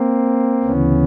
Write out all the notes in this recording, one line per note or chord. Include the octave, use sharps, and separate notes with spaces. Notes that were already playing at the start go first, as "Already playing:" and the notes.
Already playing: A#3 C4
D2 C#3 E3 B3 C#4